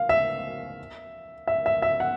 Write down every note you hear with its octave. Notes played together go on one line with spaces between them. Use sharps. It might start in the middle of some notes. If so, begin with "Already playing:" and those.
Already playing: F5
E5
E5
E5
E5
F#5